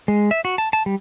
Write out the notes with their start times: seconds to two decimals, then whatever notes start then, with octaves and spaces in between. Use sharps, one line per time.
0.08 G#3
0.31 E5
0.45 F#4
0.58 A5
0.73 A5
0.86 G3